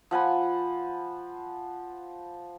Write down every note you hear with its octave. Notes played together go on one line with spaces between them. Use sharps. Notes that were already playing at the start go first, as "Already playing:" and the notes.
F3 F#5 G#5 B5